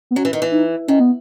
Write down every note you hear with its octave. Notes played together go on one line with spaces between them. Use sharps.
B3
F#3 C#4
E3
D#3
E3
D#4
D#3 C#4
B3